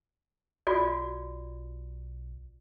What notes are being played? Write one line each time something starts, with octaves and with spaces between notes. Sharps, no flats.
B1 F4 F#4 D5